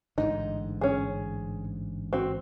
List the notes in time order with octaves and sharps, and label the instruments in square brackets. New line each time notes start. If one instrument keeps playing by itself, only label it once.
[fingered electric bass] A1 G#2 D3 [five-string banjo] D#4
[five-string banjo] C#4 G#4
C4 F#4